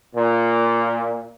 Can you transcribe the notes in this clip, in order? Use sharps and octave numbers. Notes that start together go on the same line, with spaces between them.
A#2